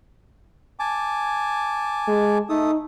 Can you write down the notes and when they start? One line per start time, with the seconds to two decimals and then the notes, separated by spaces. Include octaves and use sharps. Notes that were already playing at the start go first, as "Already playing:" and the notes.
0.79 G#5 A5 D6
2.08 G#3
2.49 A3 D#4 A4 D#6